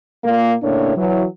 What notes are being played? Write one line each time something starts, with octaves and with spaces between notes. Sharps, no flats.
A#2 A#3
A2 C#3 A#3 D4 C#5
E3 F#3